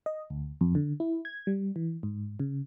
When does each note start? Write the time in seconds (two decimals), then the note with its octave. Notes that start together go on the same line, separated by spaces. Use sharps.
0.06 D#5
0.30 D2
0.61 F2
0.75 D3
1.00 E4
1.25 G#6
1.47 G3
1.76 E3
2.03 G#2
2.40 C#3